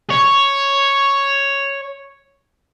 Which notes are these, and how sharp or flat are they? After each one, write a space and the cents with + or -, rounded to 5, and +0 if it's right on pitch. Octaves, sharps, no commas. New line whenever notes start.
C#5 +0